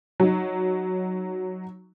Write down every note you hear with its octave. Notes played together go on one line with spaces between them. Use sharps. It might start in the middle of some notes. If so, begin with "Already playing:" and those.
F#3 D#4